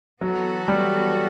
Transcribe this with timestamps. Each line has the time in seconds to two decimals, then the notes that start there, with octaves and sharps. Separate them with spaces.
0.21 E3 F#3 B3 F#4 A4
0.68 G3